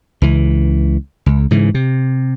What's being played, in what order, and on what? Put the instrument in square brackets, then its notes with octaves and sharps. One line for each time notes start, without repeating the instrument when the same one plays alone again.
[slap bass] C#2 E3
C#2
G#2 C#3 E3
C3